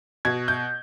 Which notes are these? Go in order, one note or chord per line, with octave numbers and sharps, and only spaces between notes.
B2 G#6
G6